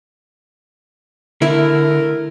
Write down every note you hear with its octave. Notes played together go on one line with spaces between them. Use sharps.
D3 A3 E4 A#4